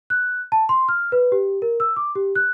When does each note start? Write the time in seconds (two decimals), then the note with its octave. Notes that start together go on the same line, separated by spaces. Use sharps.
0.10 F#6
0.52 A5
0.69 C6
0.89 F6
1.12 B4
1.32 G4
1.62 A#4
1.80 E6
1.96 D6
2.15 G4
2.35 F#6